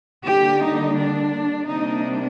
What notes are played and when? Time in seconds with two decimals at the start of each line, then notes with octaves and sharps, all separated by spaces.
0.24 D3 G3 A#3 G4
0.60 D#4
0.96 D4
1.66 C3 G3 A#3 D4 D#4